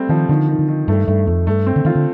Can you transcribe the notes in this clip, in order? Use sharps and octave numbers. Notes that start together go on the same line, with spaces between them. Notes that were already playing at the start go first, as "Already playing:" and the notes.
Already playing: G3 A3 C4
D#3 F3
D3 D#3
D#3
D3
D#3
G2 A3
G2 A3
F2 A3
G2 A3
C4
D3
D#3 F4
D3